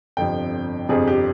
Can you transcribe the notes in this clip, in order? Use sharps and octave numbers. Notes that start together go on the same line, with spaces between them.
G1 F2 C3 F3 G5
G1 F2 C3 F3 G#4
G4